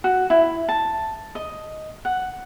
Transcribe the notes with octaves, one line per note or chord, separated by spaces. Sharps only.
F#4
E4
A5
D#5
F#5